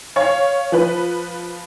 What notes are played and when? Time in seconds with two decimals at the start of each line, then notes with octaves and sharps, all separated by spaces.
0.16 C#5 F5 C#6
0.72 F3 B4